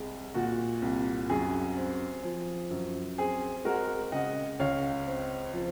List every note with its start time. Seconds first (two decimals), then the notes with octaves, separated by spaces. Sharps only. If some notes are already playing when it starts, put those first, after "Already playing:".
Already playing: C2 G#3
0.34 A#2 F#4
0.82 C2
1.29 F#2 G#4
1.77 C4
2.23 F3
2.71 F#2
3.18 C4 G#4
3.65 G#3 F#4 A#4
4.12 C#3 D#5 F#5
4.59 C#2 C#5 F5
5.07 C4
5.53 F3